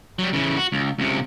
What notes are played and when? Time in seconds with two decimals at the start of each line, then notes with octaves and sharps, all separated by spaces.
0.19 F#3 G3
0.33 C#3 E3
0.57 F#4
0.72 C#2
0.99 C#2 C3